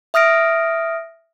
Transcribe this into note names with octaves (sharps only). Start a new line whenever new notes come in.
E5 D#6 F6 A#6 D7